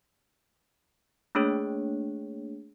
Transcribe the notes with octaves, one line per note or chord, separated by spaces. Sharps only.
A3 A#3 D4 G#4 C#5